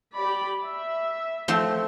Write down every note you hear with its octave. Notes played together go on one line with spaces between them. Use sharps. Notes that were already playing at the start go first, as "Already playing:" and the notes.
G4 D5 B5
E5
F3 A3 C4